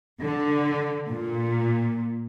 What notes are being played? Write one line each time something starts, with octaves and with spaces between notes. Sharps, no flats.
D3
A#2